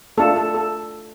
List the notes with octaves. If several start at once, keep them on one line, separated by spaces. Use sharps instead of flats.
A3 D4 F4 A4
A4
A4